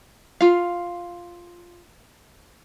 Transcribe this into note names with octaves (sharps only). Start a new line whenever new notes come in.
F4 F5